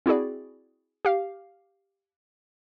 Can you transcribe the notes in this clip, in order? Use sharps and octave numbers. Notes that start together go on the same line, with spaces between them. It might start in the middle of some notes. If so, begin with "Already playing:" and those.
C4 E4 F#4 G#4 D5
G4 F5